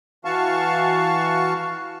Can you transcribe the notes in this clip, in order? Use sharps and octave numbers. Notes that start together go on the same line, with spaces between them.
E3 F#4 F5 A5 C#6